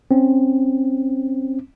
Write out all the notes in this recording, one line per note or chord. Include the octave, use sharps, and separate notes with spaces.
C4 C#4